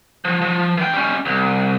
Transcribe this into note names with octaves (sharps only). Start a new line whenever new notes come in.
F3
F3
E3 G5
G3 C#4
C2